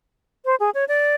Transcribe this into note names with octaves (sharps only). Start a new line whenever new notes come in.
C5
G#4
C#5
D5